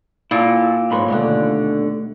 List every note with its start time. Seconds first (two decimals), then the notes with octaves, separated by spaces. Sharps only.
0.31 A#2 E4 A4
0.91 B1 G#2 B4 C#5 B5 C6
1.08 D#2 B2 D3 A3